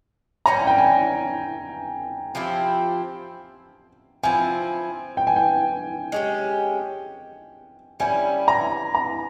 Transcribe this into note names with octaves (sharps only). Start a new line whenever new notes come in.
E3 G3 C#4 A#5
G#5
G5
G#5
F3 C4 E4 G4
F3 C4 E4 G#5
G5
G#5
G5
G#3 C#4 G4
G3 C#4 E4 G#5
A#5
A#5